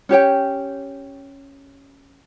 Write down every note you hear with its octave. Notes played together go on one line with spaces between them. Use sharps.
C#4 G4 C#5 G5